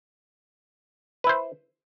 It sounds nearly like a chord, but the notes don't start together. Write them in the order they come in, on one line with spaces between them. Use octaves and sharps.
B4 E4 C5